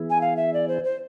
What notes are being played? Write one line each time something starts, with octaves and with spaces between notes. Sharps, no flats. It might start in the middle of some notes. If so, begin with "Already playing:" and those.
Already playing: E3 B3 E4 G#4
G#5
F5
E5
D5
C5
C5